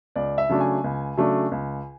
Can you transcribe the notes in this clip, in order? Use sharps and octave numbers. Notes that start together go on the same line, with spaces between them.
C#2 D5
E5
C#3 F#3 A3 D4
G#5
C#2
C#3 F#3 A3 D4
C#2